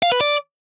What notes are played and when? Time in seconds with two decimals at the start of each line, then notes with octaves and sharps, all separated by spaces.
0.03 F5
0.12 B4
0.21 D5